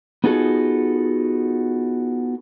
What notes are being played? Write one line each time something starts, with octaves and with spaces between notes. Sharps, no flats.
B3 D#4 F4 F#4 G#4 A4